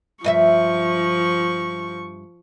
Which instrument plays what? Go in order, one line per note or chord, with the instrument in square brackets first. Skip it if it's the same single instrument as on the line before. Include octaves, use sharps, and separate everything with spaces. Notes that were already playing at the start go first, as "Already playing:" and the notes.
[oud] G2 D#5 E5 [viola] F3 C#6